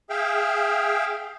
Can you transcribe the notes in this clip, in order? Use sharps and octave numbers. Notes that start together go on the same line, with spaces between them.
G#4 E5 F5 G5